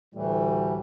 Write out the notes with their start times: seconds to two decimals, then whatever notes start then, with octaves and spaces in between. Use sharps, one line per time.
0.15 D2 A2 E3 G3